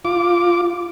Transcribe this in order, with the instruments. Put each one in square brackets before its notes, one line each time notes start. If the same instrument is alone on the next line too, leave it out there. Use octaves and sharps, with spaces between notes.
[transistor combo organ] F4 D6